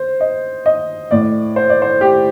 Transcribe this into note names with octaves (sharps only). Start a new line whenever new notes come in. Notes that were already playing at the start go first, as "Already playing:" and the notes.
Already playing: C5
D#5
D#5
A2 D5
C5
D5
C5
G4